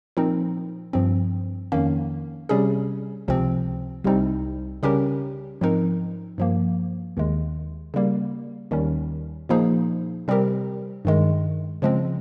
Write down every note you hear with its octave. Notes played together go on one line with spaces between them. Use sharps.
A#2 F3 C4 D#4 A#4
G2 F3 C4
F2 D#3 A#3 C#4
C3 G3 C#4 G#4
C#2 C3 F3 C4
C2 C3 G3 C4 D#4
C#3 G3 C#4 G4 A#4
G#2 F3 C4 D#4 A#4
G2 F3 A#3
D#2 D#3 G#3
C#3 G3 A#3
D#2 D#3 G3 C#4
A#2 F3 A#3 D#4 G#4
C3 G3 C4 G4 A#4
G2 D#3 G#3
C#3 F3 G#3 C4